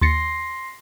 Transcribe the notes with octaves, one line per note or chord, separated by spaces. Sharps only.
D#2 C6 A6 A#6 C7 C#7